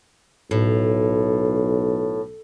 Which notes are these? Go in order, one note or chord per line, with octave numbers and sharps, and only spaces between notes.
B1 A2